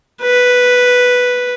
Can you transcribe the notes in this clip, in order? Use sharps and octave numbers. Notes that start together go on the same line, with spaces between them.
B4